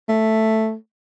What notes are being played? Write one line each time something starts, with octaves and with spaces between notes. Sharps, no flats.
A3